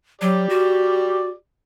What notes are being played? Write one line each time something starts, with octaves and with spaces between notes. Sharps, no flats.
F#3 G4 D5
F#4